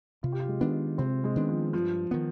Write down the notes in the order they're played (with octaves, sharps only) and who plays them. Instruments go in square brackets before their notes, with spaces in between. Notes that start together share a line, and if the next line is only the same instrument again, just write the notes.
[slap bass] C3 [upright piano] F4
[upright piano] G4
F4
G#3
[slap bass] D#3 B3 D4
[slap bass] C3 [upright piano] C4
[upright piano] G#3
[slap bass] D#3 B3 D4
[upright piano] F3
[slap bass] G2 [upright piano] F3
[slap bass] D#3 B3